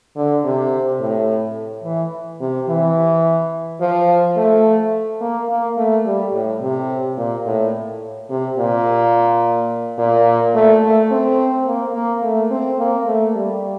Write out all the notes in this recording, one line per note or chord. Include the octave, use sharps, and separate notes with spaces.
D3
C3
A2
E3
C3
E3
F3
A3
A#3
A#3
A3
G3
A2
C3
A#2
A2
C3
A#2
A#2
A3
A3
C4
A#3
A#3
A3
C4
A#3
A3
G3